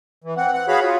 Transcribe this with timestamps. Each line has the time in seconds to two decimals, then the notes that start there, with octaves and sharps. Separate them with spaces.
0.24 E3
0.37 C4 F#5
0.54 F#5
0.68 F#4 G#4 C#5 F5 B5
0.83 F4